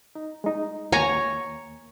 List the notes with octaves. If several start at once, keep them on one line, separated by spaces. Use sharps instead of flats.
D#4
G#3 D#4
D#2 A#3 C#5 G#5 A#5